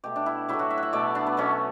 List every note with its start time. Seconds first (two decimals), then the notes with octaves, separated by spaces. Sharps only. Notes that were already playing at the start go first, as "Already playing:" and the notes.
0.04 B2 A3 G4
0.16 D4
0.26 E4
0.49 A2 F#3 A3 E4
0.59 F#4
0.70 E5
0.78 F#5
0.83 E5
0.93 B2 A3 D5
1.15 D4
1.27 B3
1.37 B2 F#3 A3 C#4